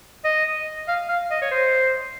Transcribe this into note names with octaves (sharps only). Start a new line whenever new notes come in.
D#5
F5
F5
D#5
C#5
C5